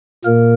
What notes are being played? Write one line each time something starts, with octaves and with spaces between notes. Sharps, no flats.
A#2 A#3 A#4